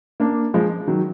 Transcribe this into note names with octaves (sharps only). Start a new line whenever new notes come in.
A#3 D4
F3 G#3
D#3 F#3